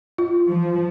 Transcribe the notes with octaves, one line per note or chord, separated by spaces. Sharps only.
F4
F3